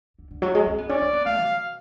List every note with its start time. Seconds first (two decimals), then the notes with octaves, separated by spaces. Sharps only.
0.19 D3
0.31 D3
0.42 F#3
0.55 G#3
0.66 C#4
0.78 B3
0.89 C#4 D5
1.01 D4
1.13 B3
1.26 A3 F5
1.44 B2